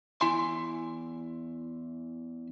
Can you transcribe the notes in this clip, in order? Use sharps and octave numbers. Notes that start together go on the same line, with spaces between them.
E2 E4 G#5 C6